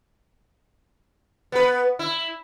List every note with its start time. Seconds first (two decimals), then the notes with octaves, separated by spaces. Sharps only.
1.52 B3 B4
1.99 E4